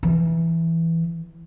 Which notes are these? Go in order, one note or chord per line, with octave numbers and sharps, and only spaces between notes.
E3